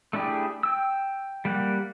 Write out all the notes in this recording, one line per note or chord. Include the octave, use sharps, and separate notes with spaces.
A3 D4 E4 G4 G#4
G5 E6
G3 A#3 G4 F#5